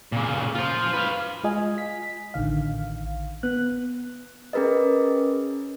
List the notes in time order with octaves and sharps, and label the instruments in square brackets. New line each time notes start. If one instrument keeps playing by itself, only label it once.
[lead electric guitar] A#2 C#3
F4 C5
B4 F5
[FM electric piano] G#3 F4 D#5 G#5
B6
A1 D3 D#3 F5
B3 F#6
[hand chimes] C#4 G#4 A#4 B4 D#5